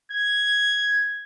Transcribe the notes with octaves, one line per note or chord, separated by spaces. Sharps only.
G#6